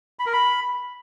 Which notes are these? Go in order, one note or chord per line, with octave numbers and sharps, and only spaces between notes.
B5
A#4
B5